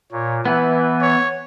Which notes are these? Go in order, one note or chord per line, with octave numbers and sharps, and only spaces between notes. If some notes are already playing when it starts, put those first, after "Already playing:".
A#2 C#5
E3 B3 E4 B4
C#5